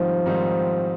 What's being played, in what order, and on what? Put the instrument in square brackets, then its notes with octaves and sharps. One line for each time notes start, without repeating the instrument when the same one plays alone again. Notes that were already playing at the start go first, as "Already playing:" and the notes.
Already playing: [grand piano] G#2 D#3 G3 C4 D#4 [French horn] F3
[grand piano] G#2 D#3 G3 C4 D#4